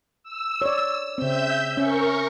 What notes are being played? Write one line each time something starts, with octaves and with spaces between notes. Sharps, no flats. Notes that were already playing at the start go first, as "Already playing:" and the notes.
E6
C#5 D5
C#3 C4 E5 E6 G6
C#4 A#4 C#6